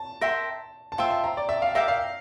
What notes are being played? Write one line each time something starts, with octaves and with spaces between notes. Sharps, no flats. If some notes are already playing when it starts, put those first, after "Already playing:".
Already playing: A5
A#4 E5 G5 C6
A5
F4 C5 E5 G5
A5
A#5
D5
E5
F5
A#4 E5 F5 G5 D6
F5